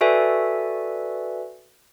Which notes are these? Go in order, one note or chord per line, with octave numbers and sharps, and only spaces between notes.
F#4 A4 B4 D5 E5 G#5